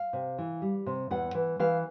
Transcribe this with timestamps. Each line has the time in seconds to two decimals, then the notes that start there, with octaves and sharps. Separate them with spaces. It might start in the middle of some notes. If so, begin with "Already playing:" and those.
Already playing: F5
0.13 C3
0.38 E3
0.62 G3
0.86 C3
1.11 E2 F#5
1.35 E3
1.59 E3 F5